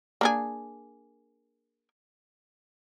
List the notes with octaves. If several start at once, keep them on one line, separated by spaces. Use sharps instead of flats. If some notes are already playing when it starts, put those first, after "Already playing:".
A#3 D4 G#4